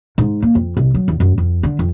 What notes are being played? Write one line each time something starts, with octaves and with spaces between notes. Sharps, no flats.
G#2
A#3
F2
C2
F#3
E2
F#2
F2
D3
F2